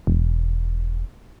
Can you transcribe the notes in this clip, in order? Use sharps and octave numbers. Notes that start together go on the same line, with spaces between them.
E1